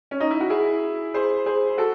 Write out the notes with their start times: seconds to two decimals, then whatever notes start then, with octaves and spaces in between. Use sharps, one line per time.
0.11 C#4
0.20 D#4
0.31 E4
0.41 F#4
0.50 E4 G#4
1.14 G#4 C5
1.46 G#4 C5
1.78 F#4 A4